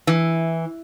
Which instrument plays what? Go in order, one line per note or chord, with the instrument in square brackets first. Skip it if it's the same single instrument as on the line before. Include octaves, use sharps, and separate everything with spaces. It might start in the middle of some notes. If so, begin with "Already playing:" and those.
[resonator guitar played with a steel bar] E3